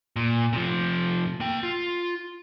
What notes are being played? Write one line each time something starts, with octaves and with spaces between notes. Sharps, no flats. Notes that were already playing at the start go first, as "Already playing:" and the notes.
A#2
C3 F3
A#3 G5
F4